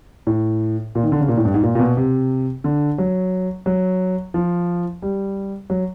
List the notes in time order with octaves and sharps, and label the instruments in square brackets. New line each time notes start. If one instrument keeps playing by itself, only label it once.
[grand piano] A2
A#2
D#3
D3
C#3
A#2
A2
G2
G#2
A#2
A#2
B2
C3
D3
F#3
F#3
F3
G3
F#3